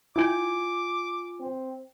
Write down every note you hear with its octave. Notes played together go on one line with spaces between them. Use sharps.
E4 F4 G5 G#5 D6
C4